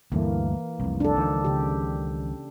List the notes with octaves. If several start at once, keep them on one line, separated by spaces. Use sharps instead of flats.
D2 G2 E3 A3 A#3
F1 C2
D4 A4
C#2 D#3 F3
C#3 G4